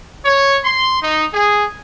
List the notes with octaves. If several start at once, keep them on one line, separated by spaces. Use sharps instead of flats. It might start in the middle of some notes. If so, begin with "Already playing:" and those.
C#5
C6
D#4
G#4